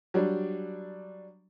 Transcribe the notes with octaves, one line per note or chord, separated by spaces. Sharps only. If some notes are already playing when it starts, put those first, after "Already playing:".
F#3 G3 D4